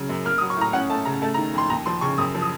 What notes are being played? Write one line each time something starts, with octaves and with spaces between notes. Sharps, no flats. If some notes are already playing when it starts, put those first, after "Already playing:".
Already playing: C#3 F#3
F#2
A#3 F6
D#6
F#3
C#6
A2 A#5
C#4 F#5
A3 A5
C#3 A#5
A3 A5
A#5
D#3
F2 C6
D#2 A#5
F3 C6
C#3 C#6
F#2 D#6
F3
D#6